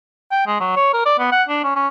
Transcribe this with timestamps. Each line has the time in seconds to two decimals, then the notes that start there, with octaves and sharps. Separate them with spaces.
0.32 G5
0.47 G#3
0.60 F#3
0.76 C#5
0.94 A#4
1.06 D5
1.19 B3
1.32 F#5
1.48 D4
1.64 C#4
1.76 C#4